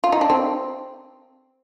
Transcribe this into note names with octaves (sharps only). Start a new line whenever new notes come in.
F4
D#4
D4
C4